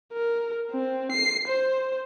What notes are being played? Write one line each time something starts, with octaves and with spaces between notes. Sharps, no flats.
A#4
C4
C7
C5